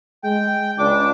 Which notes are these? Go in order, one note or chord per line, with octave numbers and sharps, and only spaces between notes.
G#3 G5
C#2 D4 D6